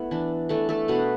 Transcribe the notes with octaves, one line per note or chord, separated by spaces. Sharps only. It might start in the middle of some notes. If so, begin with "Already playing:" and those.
Already playing: A3 B3 E4
E3 D4
E3 A3 D4 A4
A3 A4
B2 A3 B3 D4 B4